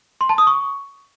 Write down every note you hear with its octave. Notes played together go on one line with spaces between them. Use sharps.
C6
A5
D#6
C#6